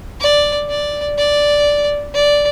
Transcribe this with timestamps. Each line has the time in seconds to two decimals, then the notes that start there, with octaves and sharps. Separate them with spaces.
0.21 D5
0.69 D5
1.18 D5
2.14 D5